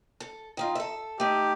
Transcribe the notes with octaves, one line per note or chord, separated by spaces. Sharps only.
A4
D#3 D#4 F4
A4 E5
A3 D#4 G4